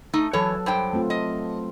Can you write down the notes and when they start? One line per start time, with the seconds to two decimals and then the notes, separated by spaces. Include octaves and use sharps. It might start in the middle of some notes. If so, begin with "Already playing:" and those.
0.13 A3 D#4
0.33 E3 F#3 A4 B4 C#5
0.66 G2 C5 G5
0.93 A3 C4 F4
1.10 D#5